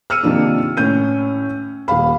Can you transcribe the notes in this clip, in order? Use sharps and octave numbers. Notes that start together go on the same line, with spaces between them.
E6 F6 C#7 D#7
C3 D#3 F3 A#3 D4
A2 C#4 G6 D#7
D#1 F5 B5